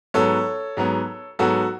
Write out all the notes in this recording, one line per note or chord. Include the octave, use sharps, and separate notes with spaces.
G#2 F#3 B3 A4 C#5
G#2 F#3 B3
G#2 F#3 B3 F#4 A4